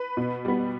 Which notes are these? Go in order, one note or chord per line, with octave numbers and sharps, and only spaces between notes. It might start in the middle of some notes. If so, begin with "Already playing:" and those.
Already playing: B4
B2
G3 B3